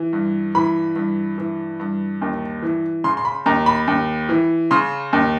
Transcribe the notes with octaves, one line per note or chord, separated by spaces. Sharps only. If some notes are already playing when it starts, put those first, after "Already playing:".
Already playing: E3
G2
E3 B5
G2
E3
G2
D#2
E3
C#3 C6
C6
B5
D#2 A#5
B5
D#2
E3
C#3 C6
D#2